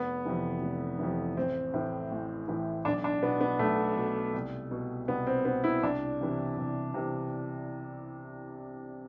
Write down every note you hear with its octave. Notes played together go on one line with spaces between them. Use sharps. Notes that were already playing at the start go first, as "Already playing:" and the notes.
Already playing: F1 B3
F2 C3 E3
F1
F2 C3 E3
A1 C4
A2 E3
A1
A2 E3
B1 D4
D4
B2 B3
B3
B1 A3
B2
C2
B2
C2 B3
C4
B2 B3
E4
C2 D4
C3 E3
C2
C3 E3